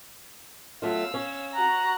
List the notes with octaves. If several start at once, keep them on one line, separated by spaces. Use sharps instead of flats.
F#3 A3 F4 F5 E6
C#4
F#4 A#5 F#6